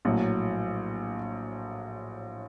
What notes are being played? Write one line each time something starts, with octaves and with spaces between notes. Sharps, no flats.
A#1 A2 F#3 A3